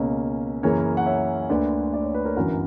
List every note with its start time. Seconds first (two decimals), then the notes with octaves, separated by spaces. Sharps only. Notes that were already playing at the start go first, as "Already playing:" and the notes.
Already playing: C#2 B2 A#3 C#4
0.63 F#2 C#3 E3 A#3 C#4 A#4 C#5
0.97 F#5
1.06 C#5 E5
1.49 D2 D3 A#3 B4 D5
1.93 D5
2.03 C#5
2.14 B4
2.25 A#4 C#5
2.36 G1 F#2 E3 F#4 A#4